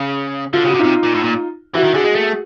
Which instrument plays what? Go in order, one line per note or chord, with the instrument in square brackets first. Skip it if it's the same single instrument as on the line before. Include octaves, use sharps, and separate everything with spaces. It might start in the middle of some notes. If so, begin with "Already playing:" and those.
Already playing: [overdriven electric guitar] C#3
[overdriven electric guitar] D3 [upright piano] F4
[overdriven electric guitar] C#3 [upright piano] F#4
[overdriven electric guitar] C3
[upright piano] D#4 F4
[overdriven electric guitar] C3
A#2
A2
A#2
[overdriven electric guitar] E3 [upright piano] E4 F#4
[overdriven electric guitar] D#3
[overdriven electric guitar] D3 [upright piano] F#4 G#4
[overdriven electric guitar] G#3
A3